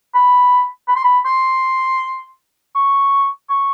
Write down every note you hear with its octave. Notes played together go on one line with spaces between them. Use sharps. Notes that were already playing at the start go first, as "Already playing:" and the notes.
B5
B5
C6
B5
C6
C#6
C#6